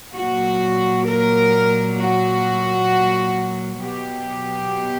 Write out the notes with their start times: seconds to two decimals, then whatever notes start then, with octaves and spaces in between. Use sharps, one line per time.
0.15 A#2 F#3 A#3 F#4
1.07 A#4
1.98 F#4
3.81 B2 F#3 B3 G4